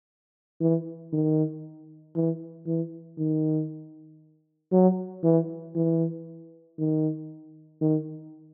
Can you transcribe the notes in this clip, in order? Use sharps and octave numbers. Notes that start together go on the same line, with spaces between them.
E3
D#3
E3
E3
D#3
F#3
E3
E3
D#3
D#3